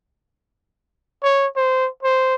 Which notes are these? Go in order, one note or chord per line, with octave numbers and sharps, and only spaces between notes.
C#5
C5
C5